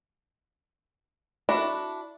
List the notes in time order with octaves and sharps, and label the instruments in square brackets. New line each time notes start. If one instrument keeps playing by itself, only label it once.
[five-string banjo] D4 E4 F#4 A4